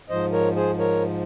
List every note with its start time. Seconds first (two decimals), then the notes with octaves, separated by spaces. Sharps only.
0.09 G#2 F3 C5 D#5
0.32 A#4 C#5
0.55 G#4 C5
0.79 A#4 C#5